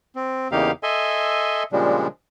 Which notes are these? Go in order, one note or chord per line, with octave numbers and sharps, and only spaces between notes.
C4
E2 C#3 A#3 D#4 G4 F5
A4 D#5 E5 G#5 C6
A#2 C#3 F3 G3 G#3 D4